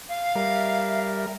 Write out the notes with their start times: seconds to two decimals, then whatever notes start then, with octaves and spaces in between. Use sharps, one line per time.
0.09 F5
0.35 G3 A#4 E5